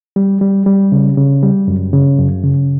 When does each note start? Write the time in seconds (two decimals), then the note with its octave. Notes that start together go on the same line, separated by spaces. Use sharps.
0.16 G3
0.41 G3
0.66 G3
0.92 C#3
1.17 C#3
1.43 G3
1.68 F#2
1.93 C#3
2.19 F#2
2.44 C#3